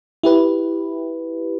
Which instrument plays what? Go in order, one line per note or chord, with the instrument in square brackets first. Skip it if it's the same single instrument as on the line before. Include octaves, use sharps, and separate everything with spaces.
[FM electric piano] E4 G4 B4